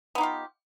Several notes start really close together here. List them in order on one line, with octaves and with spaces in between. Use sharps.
B3 D#4 G4 F4